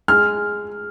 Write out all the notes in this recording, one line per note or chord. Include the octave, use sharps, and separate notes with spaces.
G#3 F6